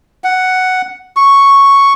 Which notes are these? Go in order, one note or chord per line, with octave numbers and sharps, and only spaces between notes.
F#5
C#6